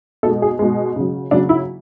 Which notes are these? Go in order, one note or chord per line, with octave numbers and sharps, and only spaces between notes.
B2 G#3 A4
G#4
B2 G#3
C#3 F#3
C#3 F#3 D4
E4